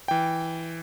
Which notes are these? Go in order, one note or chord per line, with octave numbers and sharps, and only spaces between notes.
E3 G5